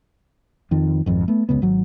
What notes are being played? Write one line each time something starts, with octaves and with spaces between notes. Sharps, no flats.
F2 D#3 F3
G#1 F2
A3 B3
F1 C#2 C#3 B3
G#1 F#3